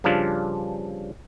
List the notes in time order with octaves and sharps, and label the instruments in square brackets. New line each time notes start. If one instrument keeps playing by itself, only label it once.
[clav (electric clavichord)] G2 C#3 F3 D4 F4